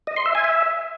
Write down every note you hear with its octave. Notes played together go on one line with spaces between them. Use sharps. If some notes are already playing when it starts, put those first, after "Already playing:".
D#5
C6
E5
G#5
E5